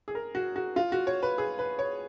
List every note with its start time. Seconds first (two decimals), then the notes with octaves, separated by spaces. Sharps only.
0.08 G#4
0.15 A#4
0.35 F#4
0.56 F#4
0.76 F4
0.92 F#4
1.07 C#5
1.23 B4
1.38 G#4
1.59 B4
1.79 C#5